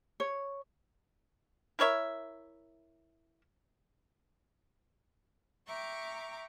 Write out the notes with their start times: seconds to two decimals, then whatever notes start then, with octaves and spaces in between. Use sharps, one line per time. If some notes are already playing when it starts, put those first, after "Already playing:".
0.20 C#5
1.79 E4 A#4 C#5 E5
5.67 E5 G5 A#5 C#6 D6